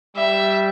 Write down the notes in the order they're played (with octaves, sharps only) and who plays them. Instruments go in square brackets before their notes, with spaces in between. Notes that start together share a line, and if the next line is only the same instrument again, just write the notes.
[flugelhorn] G3 [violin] E5